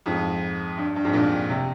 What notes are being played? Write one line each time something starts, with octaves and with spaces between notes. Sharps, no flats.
F2 G#2
G2
G2
F2 G#2
G2 A#2
C3